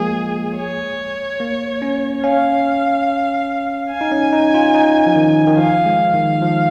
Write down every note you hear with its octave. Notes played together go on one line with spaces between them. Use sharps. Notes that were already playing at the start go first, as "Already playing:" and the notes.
Already playing: F3 G#3 A#3 G#4
C#5
A#3
C#4
C#4 F5
G#5
D#4
C#4
D#4
F4
D#4
F3
D#3
D#3
F3 F5
G#3
D#3
F3